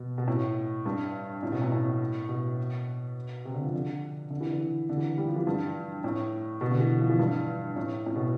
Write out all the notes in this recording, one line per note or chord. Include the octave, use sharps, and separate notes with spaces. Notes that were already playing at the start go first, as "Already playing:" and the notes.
Already playing: B2
B2
A2
G2
A2
B2
A2
A2
B2
C3
D3
F3
D3
D3
E3
D3
D3
E3
G3
F3
E3
G2
A2
B2
D3
E3
F3
E3
G2
A2
A2
B2